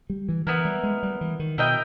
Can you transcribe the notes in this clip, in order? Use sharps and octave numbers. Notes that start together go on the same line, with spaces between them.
G3
E3
E3 B3 E4 A#4
G3
G#3
G3
E3
D#3
B2 E4 A#4 D#5 G5